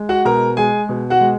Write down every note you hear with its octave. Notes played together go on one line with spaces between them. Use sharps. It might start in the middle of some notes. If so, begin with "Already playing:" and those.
Already playing: G#3
F#4 F#5
B2 A#4 A#5
G#3 G#4 G#5
B2
F#4 F#5
G#3